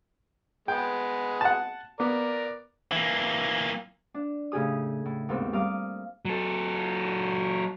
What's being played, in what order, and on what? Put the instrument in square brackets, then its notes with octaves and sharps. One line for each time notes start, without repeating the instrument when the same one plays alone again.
[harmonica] G#3 B3 G#4 [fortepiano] G5
[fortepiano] F#5 A5
[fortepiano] B3 [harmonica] A#4 D5
[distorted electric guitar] E3 A#3
[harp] D4
A2 C#3 G4 G#4 D#6
A2
D#2 G#2 B3 C4
G3 F5 A#5 D6 D#6
[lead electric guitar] F#3 A4